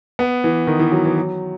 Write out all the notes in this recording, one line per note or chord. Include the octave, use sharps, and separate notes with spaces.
B3
E3
D#3
E3
F#3
E3
F#3